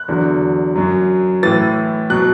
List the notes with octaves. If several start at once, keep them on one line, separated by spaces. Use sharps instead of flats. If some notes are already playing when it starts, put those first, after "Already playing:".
Already playing: F#6
E2 D3 F#3
F#2 F#3
A2 E3 A6
B2 F#3 F#6